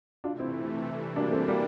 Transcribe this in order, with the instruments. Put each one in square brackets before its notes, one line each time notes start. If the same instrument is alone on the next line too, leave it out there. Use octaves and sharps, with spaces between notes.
[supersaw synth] C3 E3 A3 [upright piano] D4 F4
[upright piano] C4 E4
[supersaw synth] E3 G3 D4
[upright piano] A#3 D4
A3 C4
G3 A#3